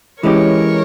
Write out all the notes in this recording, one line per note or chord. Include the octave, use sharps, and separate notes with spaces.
E3 G#3 C#4 G4 A#4 C#5